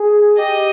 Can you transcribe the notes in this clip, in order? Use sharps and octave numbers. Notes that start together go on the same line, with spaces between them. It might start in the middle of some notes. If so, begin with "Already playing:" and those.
Already playing: G#4
G4 D#5